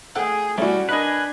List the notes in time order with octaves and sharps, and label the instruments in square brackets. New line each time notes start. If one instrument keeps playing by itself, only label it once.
[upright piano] A3 G5 [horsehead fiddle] G#4 [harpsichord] A4 F#5
[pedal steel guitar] G3 [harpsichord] A3 E4 [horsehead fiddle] C#4 F#4 [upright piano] C#5 D5
[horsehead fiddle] D4 [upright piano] A#4 D#5 B5 [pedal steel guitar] B4 G#5